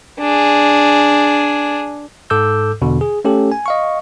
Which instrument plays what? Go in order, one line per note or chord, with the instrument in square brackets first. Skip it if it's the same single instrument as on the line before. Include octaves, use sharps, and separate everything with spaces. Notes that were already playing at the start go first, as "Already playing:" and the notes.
[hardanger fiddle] D4 G#4
[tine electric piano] G#2 A4 D6 E6 G6
E2 B2 D3
G#4
A3 C#4 G4 A4
G#5
D#5 F5 C#6